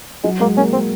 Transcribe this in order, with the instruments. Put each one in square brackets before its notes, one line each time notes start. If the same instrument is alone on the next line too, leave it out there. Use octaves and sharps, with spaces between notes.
[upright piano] F#3 [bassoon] G#3
[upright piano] G#3 [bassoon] A#3
[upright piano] A#3 [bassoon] C#4
[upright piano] G#3 [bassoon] C4